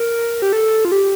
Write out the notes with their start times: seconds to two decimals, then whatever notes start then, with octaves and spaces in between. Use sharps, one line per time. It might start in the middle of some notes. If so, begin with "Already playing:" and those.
Already playing: A#4
0.42 G4
0.53 A4
0.85 F4
0.92 G4